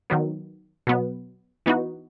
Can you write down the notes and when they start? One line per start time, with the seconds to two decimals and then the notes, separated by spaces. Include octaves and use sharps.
0.10 D#3 F#3 B3
0.87 B2 F#3 B3
1.66 E3 B3 D#4 F#4